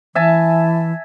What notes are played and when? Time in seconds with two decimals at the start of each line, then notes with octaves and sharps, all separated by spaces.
0.15 E3 E5 G#5 A5